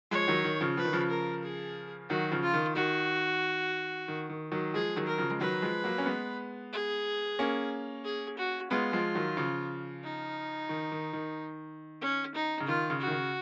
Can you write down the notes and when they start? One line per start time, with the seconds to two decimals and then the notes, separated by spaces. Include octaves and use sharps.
0.11 F3 G#3 C#5
0.28 D#3 F#3
0.44 D#3
0.61 C#3 F3
0.77 F3 B4
0.85 D#3
0.93 C#3 F3
1.11 A#4
1.44 G#4
2.09 D#3 F#3 F#4
2.31 C#3 F3
2.43 F4
2.54 D#3
2.75 D#3 F#4
4.08 D#3
4.29 D#3
4.52 D#3 F#3
4.74 F3 G#3 G#4
4.96 D#3 F#3
5.07 A#4
5.18 C#3 F3
5.30 G#3
5.40 D#3 F#3 B4
5.62 F3 G#3
5.84 F#3 A#3
5.98 C#4
6.06 G#3 B3
6.73 G#4
7.39 A#3 C#4
8.04 G#4
8.37 F#4
8.71 G#3 B3 F4
8.93 F3 G#3
9.15 D#3 F#3
9.37 C#3 F3
10.03 D#4
10.69 D#3
10.92 D#3
11.13 D#3
12.01 C#4
12.35 D#4
12.60 C#3
12.67 D#3 F4
12.90 C#3
13.01 F#4
13.07 D#3
13.11 C#3